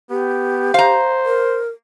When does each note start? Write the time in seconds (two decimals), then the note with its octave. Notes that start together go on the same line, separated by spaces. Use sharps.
0.10 B3 G4
0.74 C5 F5 A#5
1.26 A#4